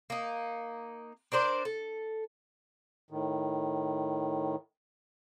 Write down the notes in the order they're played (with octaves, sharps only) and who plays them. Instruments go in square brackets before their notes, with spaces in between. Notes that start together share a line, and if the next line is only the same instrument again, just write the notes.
[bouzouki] A#3 D#4
D4 A#4 C5 D5
A4
[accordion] A2 D#3